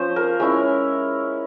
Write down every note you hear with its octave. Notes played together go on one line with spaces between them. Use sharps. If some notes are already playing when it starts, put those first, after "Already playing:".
Already playing: F3 C#4 C5
A#4
G#3 C#4 E4 A#4